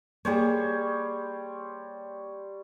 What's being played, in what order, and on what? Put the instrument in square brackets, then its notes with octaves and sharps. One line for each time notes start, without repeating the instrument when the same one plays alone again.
[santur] G3 C5 C#5 [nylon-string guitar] A#3 G#4